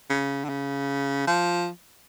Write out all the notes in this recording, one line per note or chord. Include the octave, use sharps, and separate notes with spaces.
C#3
D3
C#3
F3